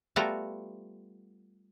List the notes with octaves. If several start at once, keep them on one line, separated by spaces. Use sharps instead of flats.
G3 A3 B3 F4 F#4 A#5